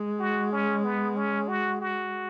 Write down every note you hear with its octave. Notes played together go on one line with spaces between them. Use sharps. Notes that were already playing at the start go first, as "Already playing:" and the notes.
Already playing: G#3
F#4
C#4
B3
C#4
F#4
F#4